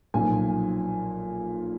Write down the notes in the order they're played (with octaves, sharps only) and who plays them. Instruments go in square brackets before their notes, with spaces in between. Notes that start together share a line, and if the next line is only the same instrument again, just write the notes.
[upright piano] B1 A#2 F3 G#5